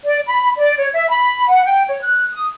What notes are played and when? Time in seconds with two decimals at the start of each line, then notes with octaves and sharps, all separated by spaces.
0.05 D5
0.28 B5
0.57 D5
0.78 C#5
0.93 E5
1.09 B5
1.48 F#5
1.65 G5
1.87 C#5
2.01 F#6
2.33 D#6